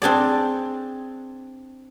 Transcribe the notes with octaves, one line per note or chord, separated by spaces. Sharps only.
C4 D4 G#4 D5